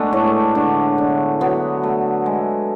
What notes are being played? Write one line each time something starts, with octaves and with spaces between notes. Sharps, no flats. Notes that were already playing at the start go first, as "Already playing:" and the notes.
Already playing: G#3 A3 B3 D4
A2
D3
D3
F#3 B3
A3
G#3